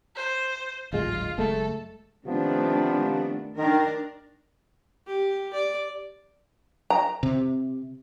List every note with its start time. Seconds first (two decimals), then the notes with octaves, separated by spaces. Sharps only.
0.16 C5
0.93 D1 G#1 G#3 F4
1.38 F#1 G#3 A3 A4
2.26 C3 D#3 F3 A3 B3 D4
3.57 D#3 D4 A#4
5.07 G4
5.54 D5
6.90 A#5
7.23 C3